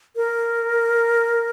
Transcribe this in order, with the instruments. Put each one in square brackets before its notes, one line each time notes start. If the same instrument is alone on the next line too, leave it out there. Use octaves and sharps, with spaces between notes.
[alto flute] A#4